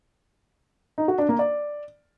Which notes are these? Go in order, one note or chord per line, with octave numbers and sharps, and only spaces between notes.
D#4
F#4
D4
A#3
D5